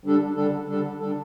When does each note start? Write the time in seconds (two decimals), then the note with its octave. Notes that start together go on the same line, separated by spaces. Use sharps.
0.04 D3 G3 D4 A4
0.35 D3 G3 D4 A4
0.68 D3 G3 D4 A4
1.00 D3 G3 D4 A4